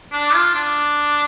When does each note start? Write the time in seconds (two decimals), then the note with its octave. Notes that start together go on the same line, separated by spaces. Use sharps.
0.12 D4
0.34 F4
0.55 D4